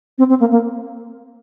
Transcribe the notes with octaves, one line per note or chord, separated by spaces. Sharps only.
C4
C4
A#3
A#3